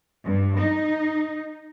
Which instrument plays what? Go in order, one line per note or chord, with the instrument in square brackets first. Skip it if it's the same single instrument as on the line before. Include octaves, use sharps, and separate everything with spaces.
[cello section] G2
D#4